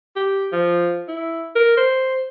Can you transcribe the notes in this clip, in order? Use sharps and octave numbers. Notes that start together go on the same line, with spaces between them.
G4
F3
E4
A#4
C5